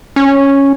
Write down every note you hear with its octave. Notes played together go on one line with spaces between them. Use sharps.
C#4